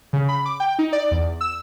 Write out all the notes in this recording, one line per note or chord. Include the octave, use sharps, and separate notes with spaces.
C#3
B5
D6
G5
D#4
D5
E2
E6